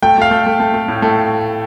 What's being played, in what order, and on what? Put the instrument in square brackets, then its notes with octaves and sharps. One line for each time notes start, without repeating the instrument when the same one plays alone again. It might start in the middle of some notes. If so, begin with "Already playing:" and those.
[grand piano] A3 G5
A3 F5
A3
A3
A3
A3
A2
A3